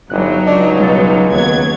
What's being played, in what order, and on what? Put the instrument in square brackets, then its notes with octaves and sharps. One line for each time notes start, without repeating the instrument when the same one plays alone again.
[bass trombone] G1 [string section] F#3 D#4 [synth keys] F#6
[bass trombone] C#2 [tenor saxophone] D4 [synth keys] D#5
[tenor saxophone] B2 [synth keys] G3 A6
[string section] D#2 F#3 G#6 [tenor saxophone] B3